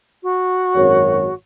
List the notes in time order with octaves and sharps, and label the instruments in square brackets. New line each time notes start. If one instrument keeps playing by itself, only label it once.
[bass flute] F#4
[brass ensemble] G#1 F#2 C#5